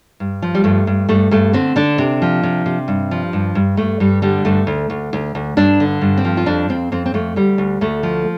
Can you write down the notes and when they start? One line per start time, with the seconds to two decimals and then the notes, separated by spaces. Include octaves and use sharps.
0.20 G2
0.42 F3
0.55 G3
0.64 G2 A3
0.87 G2
1.09 G2 A3
1.31 G2 A3
1.53 D3 C4
1.76 D3 D4
1.98 C3
2.22 F3
2.43 C3
2.66 C3
2.88 G2
3.11 F3
3.33 G2
3.55 G2
3.77 G2 A3
4.00 G2 G3
4.22 D3 G3
4.45 G2 A3
4.67 D2
4.90 D2
5.13 D2
5.35 D2
5.57 G2 D4
5.80 D3
6.01 G2
6.17 C4
6.25 F3
6.37 F4
6.46 F2 D4
6.68 F2 C4
6.92 F2 C4
7.06 C4
7.14 F2 A3
7.36 D2 G3
7.58 D2
7.81 D2 A3
8.03 F3